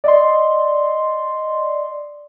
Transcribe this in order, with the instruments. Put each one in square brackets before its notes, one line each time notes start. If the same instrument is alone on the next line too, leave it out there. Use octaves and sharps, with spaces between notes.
[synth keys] D5 D#5 C6